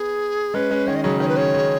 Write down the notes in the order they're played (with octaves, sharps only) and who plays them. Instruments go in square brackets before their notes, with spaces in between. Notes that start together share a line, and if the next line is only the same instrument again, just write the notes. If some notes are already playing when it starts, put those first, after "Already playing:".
Already playing: [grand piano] B3 [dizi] G#4
[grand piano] G#3 C#4 [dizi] B4
[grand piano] G#3 C#4
[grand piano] D#3 G#3 [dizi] C#5
[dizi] D#5
[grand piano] C#3 F#3 [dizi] C#5
[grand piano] D#3 [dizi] C#5
[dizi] B4
[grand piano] C#3 [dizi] C#5
[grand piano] C#3